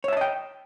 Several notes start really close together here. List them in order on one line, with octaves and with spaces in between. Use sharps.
C#5 E5 A5 D#5 G5